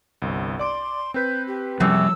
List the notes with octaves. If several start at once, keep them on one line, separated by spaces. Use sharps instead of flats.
G1 C2
D5 C6 D6 D7
C4 B4 G6 B6
G4
F#2 C3 F3 G3 E6